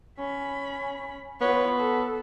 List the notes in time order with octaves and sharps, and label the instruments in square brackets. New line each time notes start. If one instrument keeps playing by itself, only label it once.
[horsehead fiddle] C#4 B5
[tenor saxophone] B3 [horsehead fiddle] F4 C#5
[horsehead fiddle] A4